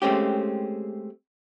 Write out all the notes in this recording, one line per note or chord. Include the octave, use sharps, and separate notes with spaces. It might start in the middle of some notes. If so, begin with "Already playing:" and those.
G#3 A3 C4 C#4 G4